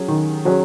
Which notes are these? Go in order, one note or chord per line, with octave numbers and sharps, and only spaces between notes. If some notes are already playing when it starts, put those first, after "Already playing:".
Already playing: F#3 C#4 G#4
D#3
F#3 C#4 G#4